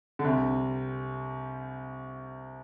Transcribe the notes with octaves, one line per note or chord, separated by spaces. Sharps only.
D3
C2 C3